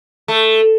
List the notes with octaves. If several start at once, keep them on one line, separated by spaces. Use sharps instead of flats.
A3